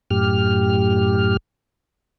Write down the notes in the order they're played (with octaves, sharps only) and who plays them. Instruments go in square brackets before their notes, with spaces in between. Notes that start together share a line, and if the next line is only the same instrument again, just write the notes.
[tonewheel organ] F#2 A2 G4 F6